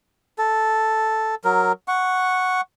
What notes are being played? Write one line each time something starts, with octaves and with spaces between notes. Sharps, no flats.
A4
F#3 A#4
F#5 C#6